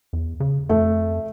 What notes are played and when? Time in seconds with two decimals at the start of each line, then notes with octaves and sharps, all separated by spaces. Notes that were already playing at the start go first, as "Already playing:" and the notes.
0.13 E2
0.40 C#3
0.69 F2 A3